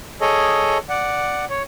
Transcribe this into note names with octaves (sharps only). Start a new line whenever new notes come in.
G#4 A4 C#5 D#5
D5 F#5
C#5